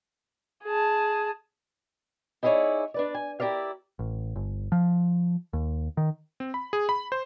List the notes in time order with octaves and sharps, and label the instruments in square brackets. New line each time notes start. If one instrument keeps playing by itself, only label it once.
[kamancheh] G#4 A5
[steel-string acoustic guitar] D#4 E4 G#4 A#4 C#5 D5
D4 B4 D5
G#5
E4 G4 A#4 D5 F5
[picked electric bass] A1
G1
F3
D#2
D#3
[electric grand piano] C4
B5
G#4
B5
C5